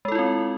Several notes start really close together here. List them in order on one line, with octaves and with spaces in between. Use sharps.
G#3 A4 E4 F4 C4